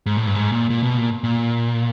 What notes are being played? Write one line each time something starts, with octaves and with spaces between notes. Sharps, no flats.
G#2
A2
G2
G#2
A#2
A#2
B2
A#2
A#2